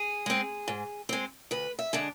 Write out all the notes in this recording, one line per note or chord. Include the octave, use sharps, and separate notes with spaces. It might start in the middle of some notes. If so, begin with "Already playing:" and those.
Already playing: G#4
G#3 C4
G#2
G#3 C4
D2 B4
E5
D3 G#3 D4